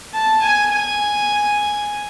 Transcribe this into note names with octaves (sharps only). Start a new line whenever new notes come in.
A5
G#5
G#5